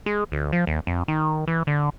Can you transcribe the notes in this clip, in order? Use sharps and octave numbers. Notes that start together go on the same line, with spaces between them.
G#3
D2
F3
D#2
F2
D#3
E3
D3